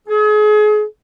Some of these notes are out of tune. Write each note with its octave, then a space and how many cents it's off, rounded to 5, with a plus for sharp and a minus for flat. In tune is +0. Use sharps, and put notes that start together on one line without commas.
G#4 +35